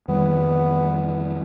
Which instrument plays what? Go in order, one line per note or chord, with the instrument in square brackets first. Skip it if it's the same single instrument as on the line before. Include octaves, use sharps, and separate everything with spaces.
[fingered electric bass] F2 D#3 E3 [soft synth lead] G3 [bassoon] B3